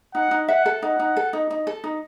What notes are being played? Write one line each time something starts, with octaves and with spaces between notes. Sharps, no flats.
D#4 F#5
D#4
E5 F#5
A4
D#4 F#5
D#4
A4
D#4
D#4
A4
D#4